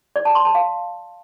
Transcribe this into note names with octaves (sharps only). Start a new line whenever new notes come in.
D5
A5
C6
A5
F5